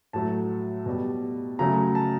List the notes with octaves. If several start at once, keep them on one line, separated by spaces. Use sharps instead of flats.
A2 F#3 A3 A5
B2 G3
C#3 F#3 A3 A#5
A5